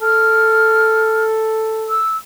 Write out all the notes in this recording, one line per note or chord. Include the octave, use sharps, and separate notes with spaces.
A4 F6
E6